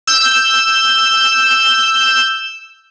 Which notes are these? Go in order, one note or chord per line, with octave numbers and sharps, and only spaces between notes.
E6 G6